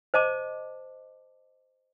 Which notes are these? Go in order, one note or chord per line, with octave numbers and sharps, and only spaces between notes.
C5 D#5 A5 D6